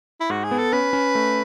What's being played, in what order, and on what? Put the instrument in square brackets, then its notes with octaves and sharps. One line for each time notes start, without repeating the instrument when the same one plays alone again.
[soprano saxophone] E4
[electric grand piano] G#2 [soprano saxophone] F#4
[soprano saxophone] G#4
[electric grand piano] B3
[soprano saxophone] A4
[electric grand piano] C#4 [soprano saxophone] B4
[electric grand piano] C#4
A3